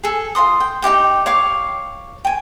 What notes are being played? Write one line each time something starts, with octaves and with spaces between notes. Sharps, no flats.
G#4 A4
F4 A#4 C6 D#6
G5
D#4 E4 G4 G5
C#5 F5 C#6 D6
G5 G#5